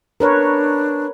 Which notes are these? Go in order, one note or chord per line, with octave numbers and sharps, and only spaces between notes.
D4 A#4 B4 C#5